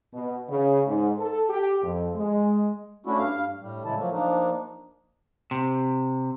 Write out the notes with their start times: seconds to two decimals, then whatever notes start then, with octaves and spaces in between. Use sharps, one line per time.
0.13 B2
0.49 C#3
0.87 G#2
1.20 A4
1.49 G4
1.83 F2
2.15 G#3
3.06 A3 C#4 D4 E4 F#4
3.18 G2 F5
3.61 A2 G3
3.85 A2 C#3 E3 G#3 E4 A5
3.98 F3 F#3 A3 A#3
4.13 F3 A#3 D4 D#4
5.51 C3